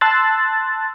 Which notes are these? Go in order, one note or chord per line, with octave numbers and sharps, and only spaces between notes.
A5 C6 E6 F#6 A6